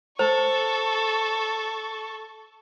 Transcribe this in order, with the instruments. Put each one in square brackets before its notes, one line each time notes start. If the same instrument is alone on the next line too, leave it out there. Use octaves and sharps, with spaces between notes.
[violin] A4 C#6 [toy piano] C5